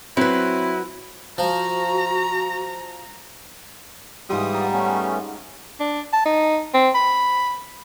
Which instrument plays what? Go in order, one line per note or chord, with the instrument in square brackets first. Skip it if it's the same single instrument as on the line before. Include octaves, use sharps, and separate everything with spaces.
[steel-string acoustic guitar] F#3 B4 [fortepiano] C4 [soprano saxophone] E4
[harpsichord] F3 [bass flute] F#4 [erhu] A#5
[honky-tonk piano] G#2 G4 [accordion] E3 D#6 [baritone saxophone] G3 [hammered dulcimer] F4 C#5
[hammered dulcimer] D5 F#5 A#5
[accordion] A3 B3 C#4
[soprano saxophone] D4
A5
D#4
C4
B5